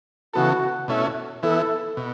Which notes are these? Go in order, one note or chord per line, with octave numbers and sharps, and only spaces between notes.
C#3 E3 B3 F#4 A4
B2 A3 C#4 E4
E3 B3 E4 A4
B2